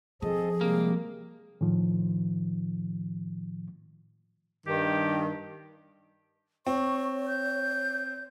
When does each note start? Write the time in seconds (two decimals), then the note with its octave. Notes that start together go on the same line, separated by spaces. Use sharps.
0.22 F3 C4 G#4 A4 D#5
0.61 C3 G3 G#3 A#3
1.61 A2 D#3 F3
4.67 G2 D#3 G4
6.67 C4 C#5 C#6
7.27 G6